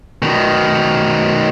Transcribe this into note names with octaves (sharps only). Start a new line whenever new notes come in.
B2 D#3